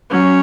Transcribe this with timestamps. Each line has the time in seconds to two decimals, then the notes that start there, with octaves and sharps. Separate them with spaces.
0.11 F#3 C#4